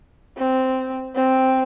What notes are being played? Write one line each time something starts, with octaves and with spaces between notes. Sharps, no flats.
C4
C4